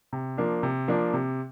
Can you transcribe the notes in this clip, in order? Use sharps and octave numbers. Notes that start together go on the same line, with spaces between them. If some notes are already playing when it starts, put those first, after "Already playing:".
C3
F3 A#3 D4
C3
F3 A#3 D4
C3